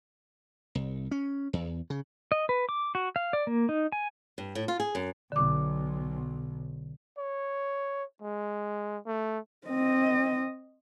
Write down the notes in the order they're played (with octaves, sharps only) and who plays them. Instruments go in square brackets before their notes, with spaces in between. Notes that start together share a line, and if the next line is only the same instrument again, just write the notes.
[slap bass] C2
C#4
E2
C#3
[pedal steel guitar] D#5
B4
D6
F#4
F5
D5
A#3
D#4
G#5
[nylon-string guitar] G2
A2
F4
G#4
F#2
[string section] B1 [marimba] D3 D6
[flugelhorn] C#5
G#3
A3
[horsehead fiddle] C4 D#5